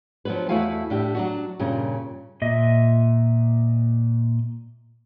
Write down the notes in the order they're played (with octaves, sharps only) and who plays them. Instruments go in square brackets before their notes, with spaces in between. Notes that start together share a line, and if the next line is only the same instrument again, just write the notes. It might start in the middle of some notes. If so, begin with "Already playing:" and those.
[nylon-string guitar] F3 F#3 B3 D4 B4
E2 A3 E4 F#4 F5 G#5
A2 D4 G4 E5
F#3 D4 F#4
G2 A#2 C#3 C#4
[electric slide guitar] A#2 D#5 E5